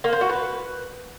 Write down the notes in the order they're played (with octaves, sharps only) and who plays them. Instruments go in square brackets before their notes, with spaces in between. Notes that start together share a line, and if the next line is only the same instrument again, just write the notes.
[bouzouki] A#3
C5
F#4
B4